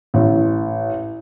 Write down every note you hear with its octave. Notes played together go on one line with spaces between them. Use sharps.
A1